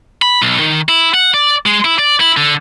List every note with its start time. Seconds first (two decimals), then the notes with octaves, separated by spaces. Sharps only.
0.22 B5
0.42 B1
0.60 D#3
0.89 E4
1.14 F#5
1.34 D5
1.66 G#3
1.85 E4
1.99 D5
2.21 E4
2.37 D3